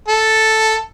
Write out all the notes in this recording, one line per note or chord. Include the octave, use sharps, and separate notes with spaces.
A4